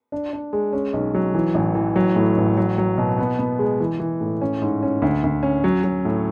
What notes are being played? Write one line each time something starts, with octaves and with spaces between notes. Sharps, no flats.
D4
D4
G#3
C#4
B1
F#3
E3
A1
E3
F#3
A2
A1
F#3
F#3
B2
B3
B3
G#3
E3
E3
A2
C#4
G#2
C#4
D2
D2
C#4
F#3
F#3
A2